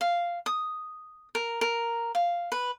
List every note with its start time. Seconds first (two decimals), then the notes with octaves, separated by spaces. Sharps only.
0.01 F5
0.46 D#6
1.35 A#4
1.61 A#4
2.15 F5
2.52 B4